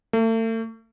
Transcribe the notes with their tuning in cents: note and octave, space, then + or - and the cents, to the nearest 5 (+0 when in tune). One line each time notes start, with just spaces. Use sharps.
A3 +40